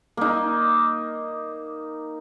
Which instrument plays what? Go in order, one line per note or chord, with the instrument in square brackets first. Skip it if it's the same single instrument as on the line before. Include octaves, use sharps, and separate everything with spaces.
[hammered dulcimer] A#3 D#4